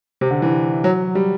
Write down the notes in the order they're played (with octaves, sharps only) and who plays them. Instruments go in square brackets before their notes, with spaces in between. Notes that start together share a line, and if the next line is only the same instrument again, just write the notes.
[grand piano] C3
D3
E3
F#3
G3